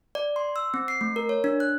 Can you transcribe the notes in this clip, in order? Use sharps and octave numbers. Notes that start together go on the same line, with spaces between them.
D5
C6
E6
C4
C7
A3
A#4
C#5
D4
F#6